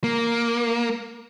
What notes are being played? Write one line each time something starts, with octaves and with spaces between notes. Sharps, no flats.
A#3